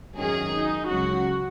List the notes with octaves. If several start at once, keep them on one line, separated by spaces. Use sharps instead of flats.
G#1 F#2 D#3 F#3 C#4 G#4
D#4
C#2 C#3 F#3 F#4